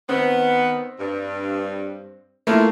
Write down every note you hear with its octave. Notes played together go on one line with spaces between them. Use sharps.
D#3 B3 C4
G2
A3 A#3 E4 F4